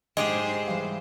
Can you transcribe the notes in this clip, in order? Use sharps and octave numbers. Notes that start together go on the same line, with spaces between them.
G#2 G#3 G4 G#4 C5 D#5
E3 G3 F5